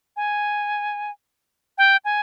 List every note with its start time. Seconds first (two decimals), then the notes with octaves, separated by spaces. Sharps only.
0.17 G#5
1.78 G5
2.05 G#5